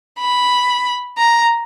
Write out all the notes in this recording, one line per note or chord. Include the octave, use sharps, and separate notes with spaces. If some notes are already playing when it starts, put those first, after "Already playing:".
B5
A#5